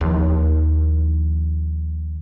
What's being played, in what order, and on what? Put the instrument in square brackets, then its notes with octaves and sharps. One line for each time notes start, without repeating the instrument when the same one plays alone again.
[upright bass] D#2 F3